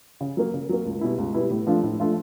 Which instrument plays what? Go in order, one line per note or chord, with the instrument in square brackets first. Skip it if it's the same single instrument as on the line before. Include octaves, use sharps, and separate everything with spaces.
[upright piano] C#3
F#3 A#3
C#3
F#3 A#3
C#2
B2 G3 B3 E4
C#2
B2 G3 B3 E4
A2
F3 A3 D4 F4
A2
F3 A3 D4 F4